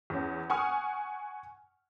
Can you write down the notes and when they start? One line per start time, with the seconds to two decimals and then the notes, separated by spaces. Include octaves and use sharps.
0.10 E2 C#4
0.50 F#5 G#5 C#6 D#6 F6